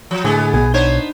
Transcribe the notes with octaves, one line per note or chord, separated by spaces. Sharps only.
F3
A2 D3 G#3 B3 G#4
B1 G#4
B3 D4 D#4 C5 C#5